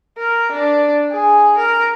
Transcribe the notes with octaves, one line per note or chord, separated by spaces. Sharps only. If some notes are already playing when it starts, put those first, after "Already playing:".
A#4
D4
G#4
A#4